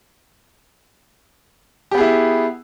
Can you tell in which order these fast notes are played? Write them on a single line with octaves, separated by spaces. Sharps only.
G4 B3 G#4 E4